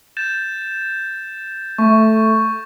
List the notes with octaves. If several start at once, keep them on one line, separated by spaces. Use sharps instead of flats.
G6 A6 E7
A3 C#6